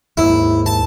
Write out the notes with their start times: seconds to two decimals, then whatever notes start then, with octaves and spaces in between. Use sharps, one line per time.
0.17 D#2 G#2 E4
0.66 A5